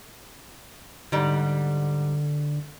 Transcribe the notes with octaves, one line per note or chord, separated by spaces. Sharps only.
G#2 D3 G3